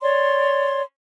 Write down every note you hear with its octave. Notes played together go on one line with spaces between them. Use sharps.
C#5 D5 C6